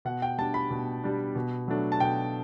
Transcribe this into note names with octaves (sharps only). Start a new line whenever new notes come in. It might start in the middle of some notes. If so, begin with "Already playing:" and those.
B2 F#5
G5
G3 D4 A5
B5
B2
G3 D4
B2
F#3 A3 D4
A5
B2 G5